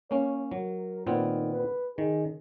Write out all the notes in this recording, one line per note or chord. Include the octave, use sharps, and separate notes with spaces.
A#3 C#4 C#5
F#3 A#4
A#2 D#3 B3 C4
B4
D#3 G#4